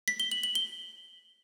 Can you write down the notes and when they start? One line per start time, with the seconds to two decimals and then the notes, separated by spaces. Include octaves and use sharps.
0.08 B6
0.20 G7
0.32 F#7
0.43 F#7
0.55 G7